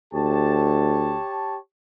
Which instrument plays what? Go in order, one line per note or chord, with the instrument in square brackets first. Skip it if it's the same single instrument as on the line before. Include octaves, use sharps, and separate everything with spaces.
[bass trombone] D2 [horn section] G4 C#5 A5